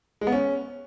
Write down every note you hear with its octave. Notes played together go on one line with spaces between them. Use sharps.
G#3
B3
C#4